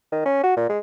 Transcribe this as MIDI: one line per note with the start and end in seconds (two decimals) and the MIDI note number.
0.12 0.21 51
0.25 0.41 61
0.43 0.55 66
0.57 0.65 46
0.69 0.79 56